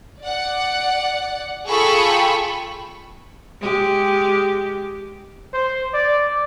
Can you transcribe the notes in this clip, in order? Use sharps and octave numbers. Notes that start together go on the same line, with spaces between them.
D5 F#5
F4 G#4 A4 G5 B5 C#6
G#3 G4
C5
D5